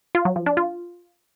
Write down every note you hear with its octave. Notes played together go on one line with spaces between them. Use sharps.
F4
F#3
F3
D4
F4